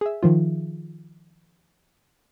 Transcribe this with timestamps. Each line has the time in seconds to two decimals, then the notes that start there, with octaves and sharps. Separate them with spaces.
0.01 G#4 E5
0.23 D#3 F3 F4